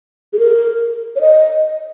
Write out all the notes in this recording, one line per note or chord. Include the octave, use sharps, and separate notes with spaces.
G#4
A#4
C#5
D#5